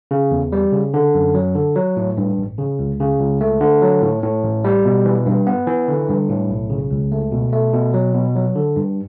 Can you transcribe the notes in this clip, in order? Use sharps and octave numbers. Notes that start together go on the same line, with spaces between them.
C#3
E2
G3
C#3
D3
F#2
F#3
D3
F#3
A2
G2
A1
C#3
C#2
C#3
C#2
A3
D3
F#3
A2
A2
A1
G3
B2
E3
G2
B3
E3
D3
G2
A2
B1
C#3
C#2
A3
B2
A3
B2
F#3
B2
F#3
D3
G2